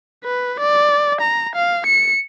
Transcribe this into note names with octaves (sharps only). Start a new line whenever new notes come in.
B4
D5
A#5
F5
C#7